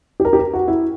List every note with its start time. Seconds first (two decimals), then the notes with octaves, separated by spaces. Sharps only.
0.20 G4
0.25 A#4
0.33 G4
0.39 A#4
0.54 F#4
0.68 E4